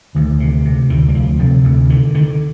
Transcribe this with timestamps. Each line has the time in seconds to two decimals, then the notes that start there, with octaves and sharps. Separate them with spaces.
0.15 D2 D#3
0.40 C3
0.65 C3
0.90 D2 D#3
1.08 G3
1.15 D2 F3
1.39 C3 F3
1.64 D2 D3
1.89 D3 D#3
2.14 D3 D#3